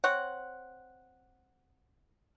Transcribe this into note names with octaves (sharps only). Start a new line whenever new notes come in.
C4 C#5 F#5